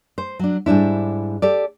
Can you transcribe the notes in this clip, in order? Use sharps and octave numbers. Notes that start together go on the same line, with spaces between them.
C5
F#3 D4
G#2 G3 D4 E4
G4 A4 D5